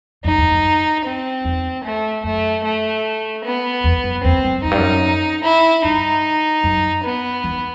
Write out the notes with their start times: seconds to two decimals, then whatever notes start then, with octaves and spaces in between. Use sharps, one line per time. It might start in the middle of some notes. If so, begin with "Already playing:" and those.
0.24 F#2 D#4
0.38 E2
0.51 F#2
1.05 C4
1.45 E2
1.84 A3
2.24 F#2 A3
2.64 A3
3.43 B3
3.84 E2
4.04 F#2
4.23 E2 C4
4.44 F#2
4.63 F#2 D#4
4.71 G2
4.78 F#2
5.43 E4
5.84 G2 D#4
6.64 F#2
7.04 B3
7.44 E2